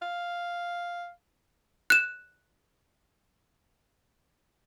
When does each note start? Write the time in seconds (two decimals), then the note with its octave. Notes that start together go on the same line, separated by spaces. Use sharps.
0.02 F5
1.90 F#6 E7